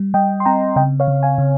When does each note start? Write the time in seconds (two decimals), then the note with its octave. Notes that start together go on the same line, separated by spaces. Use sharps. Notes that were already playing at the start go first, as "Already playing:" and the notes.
Already playing: G3
0.14 G3 D#5 G5
0.40 C6
0.45 C4 G5 A#5
0.76 C#3 D#5 G5
1.00 C#5 F5
1.08 C#3
1.23 F5 G#5
1.38 C#3